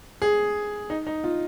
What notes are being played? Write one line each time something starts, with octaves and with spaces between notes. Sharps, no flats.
G#4
D#4
D#4
F4